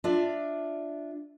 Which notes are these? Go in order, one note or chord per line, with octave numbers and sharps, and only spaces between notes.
D4 F4 D5 E5